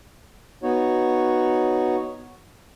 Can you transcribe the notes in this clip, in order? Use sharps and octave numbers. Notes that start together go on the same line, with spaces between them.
B3 D#4 F#4 C#5